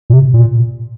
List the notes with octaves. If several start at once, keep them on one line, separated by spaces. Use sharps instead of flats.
A#2
C3
A#2